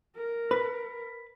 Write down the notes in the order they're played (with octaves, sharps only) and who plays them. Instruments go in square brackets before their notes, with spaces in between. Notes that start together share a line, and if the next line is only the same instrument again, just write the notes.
[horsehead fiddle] A#4
[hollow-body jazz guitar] B4